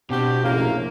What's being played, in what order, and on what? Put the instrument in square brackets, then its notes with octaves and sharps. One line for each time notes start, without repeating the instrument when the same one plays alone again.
[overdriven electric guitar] B2 [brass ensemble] C4 [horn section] D4 F#4 G4
[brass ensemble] A#1 F#2 A2 [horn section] C#3 F3 A#3